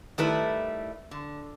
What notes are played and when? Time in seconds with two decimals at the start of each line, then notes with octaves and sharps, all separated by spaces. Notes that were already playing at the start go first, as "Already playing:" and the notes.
0.18 D#3 G3 A3 E4 B4
1.11 D3